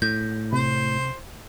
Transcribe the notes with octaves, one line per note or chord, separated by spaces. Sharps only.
A2 G6
C3 C5